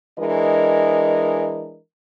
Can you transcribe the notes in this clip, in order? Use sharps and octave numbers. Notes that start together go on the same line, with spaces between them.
E3 G#3 D4 A#4 D#5